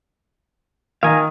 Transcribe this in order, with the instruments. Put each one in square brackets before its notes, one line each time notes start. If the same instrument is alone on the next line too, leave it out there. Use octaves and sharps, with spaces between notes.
[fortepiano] D#3 [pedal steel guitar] F5 G#5 A#5